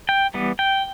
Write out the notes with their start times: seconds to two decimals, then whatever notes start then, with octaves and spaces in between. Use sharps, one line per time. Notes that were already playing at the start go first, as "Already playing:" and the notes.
0.09 G5
0.34 E3 G3 B3
0.59 G5